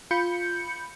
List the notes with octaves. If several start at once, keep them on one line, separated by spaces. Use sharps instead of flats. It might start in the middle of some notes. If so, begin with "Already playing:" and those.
F4 B5 G6 C#7